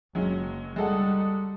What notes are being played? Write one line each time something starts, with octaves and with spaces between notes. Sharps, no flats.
F#1 F#3 G#3 C#4
G3 G#3 D#4 A4 F#5